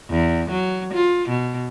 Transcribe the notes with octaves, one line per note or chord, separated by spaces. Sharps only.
E2
F#3
F4
B2